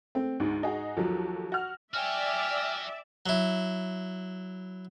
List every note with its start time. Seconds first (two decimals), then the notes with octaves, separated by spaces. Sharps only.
0.15 A3 C4
0.40 D2 G#2
0.63 D#4 F#4 G#4
0.97 D#2 F3 F#3 A4
1.52 F#4 F6
1.94 F#4 C#5 D5 E5 G5 G#5 F6
3.26 F#3 E4